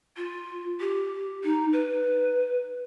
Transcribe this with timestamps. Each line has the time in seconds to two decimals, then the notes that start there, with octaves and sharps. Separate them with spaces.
0.17 F4
0.80 G4
1.44 D#4
1.72 B4